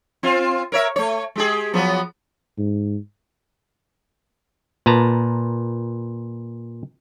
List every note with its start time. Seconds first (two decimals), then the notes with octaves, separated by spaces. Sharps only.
0.23 C4 F4
0.72 A#4 C#5 E5
0.96 A3 C#5
1.36 G#3 G4 G#4
1.74 F3 F#3 B3
2.58 G#2
4.86 A#2 B4 A5 A#5